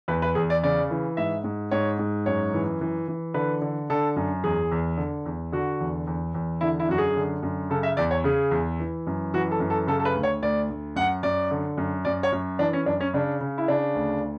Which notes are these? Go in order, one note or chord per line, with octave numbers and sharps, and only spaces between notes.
E2 B4
B4
E2 G#4
D5
C#3 D5
E3
G#2 E5
G#2
G#2 C#5
G#2
F#2 C#5
E3
E3
E3
D3 B4
D3
D3 A4
F#2
E2 G#4
E2
D3
E2
D3 F#4
E2
E2
E2
D3 E4
E4
F#2 F#4
G#4
D3
F#2
C#3 A4
E5
E2 D5
C#5
C#3 G#4
E2
E3
F#2
E3 F#4
A4
F#2
A4
C#3 A4
A4
B4
D2
C#5
D2 D5
D2
F#2 F#5
F#2 D5
D3
F#2
F#2 D5
C#5
F#2
E3 D4
C#4
F#2 D4
C#4
C#3 D4
C#3
E4
C#3 D4
D2